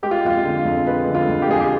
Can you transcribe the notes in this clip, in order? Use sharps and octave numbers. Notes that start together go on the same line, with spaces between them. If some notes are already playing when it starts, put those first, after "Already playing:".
G#3 G4
F4
F2 F4
D3
F2
G#3 B4
D3
F4
F2
G4
F2 G#4
G4